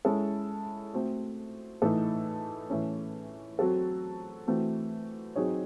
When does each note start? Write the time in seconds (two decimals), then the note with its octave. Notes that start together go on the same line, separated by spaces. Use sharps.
0.05 G#3 C#4 E4 A4
0.94 A3 C4 F#4
1.82 A2 E3 A3 D#4 A4
2.70 A2 E3 A3 C#4
3.59 F#3 C4 F#4 A4
4.47 E3 A3 C4 F#4
5.36 F#3 C4 D#4 G#4 C#5